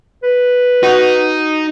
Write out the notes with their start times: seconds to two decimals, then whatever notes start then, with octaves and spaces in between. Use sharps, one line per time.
0.23 B4
0.83 D#4 F#4